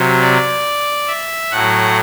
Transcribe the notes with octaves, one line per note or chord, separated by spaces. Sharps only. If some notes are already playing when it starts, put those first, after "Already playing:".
Already playing: C3 F#3
D5
E5
A2 F#3 F#5